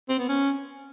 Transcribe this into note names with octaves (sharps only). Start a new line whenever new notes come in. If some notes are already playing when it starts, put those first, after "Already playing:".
C4
B3
C#4